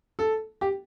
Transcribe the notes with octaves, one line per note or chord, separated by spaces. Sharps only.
A4
G4